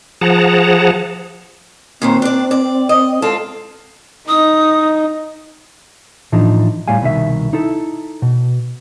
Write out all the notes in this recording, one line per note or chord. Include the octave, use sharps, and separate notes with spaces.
F3 G#4 F#5 A5 A#5
D#2 A#2 C4 C5
D4 D5
D5
D#5
G#2 F4 A4 A5
D#4 D#6
A2 E3 F3 D4 D#4
A2 G3 F5 G#5
C2 B2 D#3 E5
D#4 E4 A4
B2